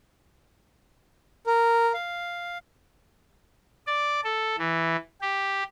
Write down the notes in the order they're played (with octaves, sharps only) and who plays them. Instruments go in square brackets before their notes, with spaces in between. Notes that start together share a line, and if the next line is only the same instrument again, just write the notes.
[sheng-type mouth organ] A#4
F5
[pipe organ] D5
A4
E3
G4